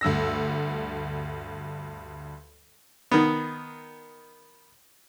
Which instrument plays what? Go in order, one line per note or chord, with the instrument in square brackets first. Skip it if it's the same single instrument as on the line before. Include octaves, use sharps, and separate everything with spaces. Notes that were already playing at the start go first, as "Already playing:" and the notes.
[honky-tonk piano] D2 G2 E6 A#6
[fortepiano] D#3 B3